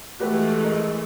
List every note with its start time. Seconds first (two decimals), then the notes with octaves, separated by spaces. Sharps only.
0.20 E3 G#3 A3 F#4 G4 B4
0.62 A#4 D#5